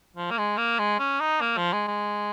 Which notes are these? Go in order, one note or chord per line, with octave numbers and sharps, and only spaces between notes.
F3
A#3
G#3
A#3
G#3
C#4
D#4
A#3
F3
G#3
G#3